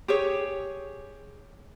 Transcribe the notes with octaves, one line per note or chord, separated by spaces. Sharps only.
G4 G#4 C#5